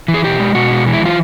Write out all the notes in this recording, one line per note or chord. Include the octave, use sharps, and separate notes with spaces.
E3
G#4
B2 G4
G#3
B2 F#4
G#3
E3
E4
E3 F4